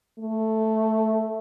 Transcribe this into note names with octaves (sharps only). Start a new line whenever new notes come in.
A3